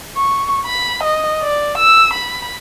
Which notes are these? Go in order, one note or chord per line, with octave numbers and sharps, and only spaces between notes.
C#6
B5
D#5
D5
E6
B5